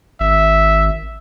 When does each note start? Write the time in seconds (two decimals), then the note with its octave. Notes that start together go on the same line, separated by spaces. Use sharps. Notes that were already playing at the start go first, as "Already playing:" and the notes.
0.20 G#1 E5